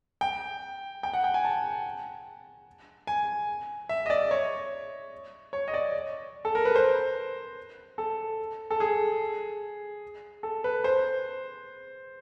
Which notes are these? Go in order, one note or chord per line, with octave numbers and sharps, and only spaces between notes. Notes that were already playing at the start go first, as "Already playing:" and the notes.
G5
G5
F#5
G5
G#5
A5
G#5
E5
D#5
D5
C#5
C#5
D#5
D5
A4
A#4
B4
C5
A4
A4
G#4
A4
B4
C5